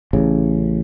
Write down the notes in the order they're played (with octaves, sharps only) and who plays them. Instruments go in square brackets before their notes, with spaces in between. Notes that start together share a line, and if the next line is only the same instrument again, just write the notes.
[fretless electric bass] A1 C#3